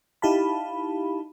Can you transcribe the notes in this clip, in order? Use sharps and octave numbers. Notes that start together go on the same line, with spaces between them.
D#4 E4 G4 F5 A5 B5